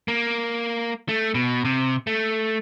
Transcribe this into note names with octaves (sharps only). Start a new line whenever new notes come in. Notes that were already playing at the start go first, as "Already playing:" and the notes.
A#3
A3
B2
C3
A3